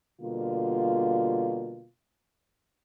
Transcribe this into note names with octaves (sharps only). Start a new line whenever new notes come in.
B2 D3 G3 A#3 F4